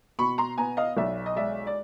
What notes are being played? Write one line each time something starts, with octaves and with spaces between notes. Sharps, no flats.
B2 B5 C#6
A#5 C6
B3 G#5 A#5
D#5 F5
B1 D5 E5
D#5
G#3 D5 E5
D5